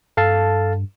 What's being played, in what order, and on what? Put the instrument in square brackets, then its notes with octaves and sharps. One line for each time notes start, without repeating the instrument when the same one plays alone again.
[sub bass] G2 [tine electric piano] A4 F5 A5